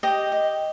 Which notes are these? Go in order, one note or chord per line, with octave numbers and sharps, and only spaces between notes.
G4 D#5
D#5